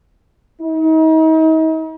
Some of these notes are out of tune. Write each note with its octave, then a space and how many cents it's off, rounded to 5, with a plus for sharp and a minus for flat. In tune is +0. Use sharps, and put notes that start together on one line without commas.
D#4 +40